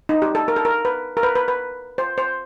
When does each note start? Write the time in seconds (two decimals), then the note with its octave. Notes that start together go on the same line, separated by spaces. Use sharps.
0.09 D#4
0.22 G4
0.35 A4
0.48 A#4
0.56 A4
0.65 A#4
0.85 B4
1.17 A#4
1.23 B4
1.35 B4
1.48 B4
1.98 C5
2.18 C5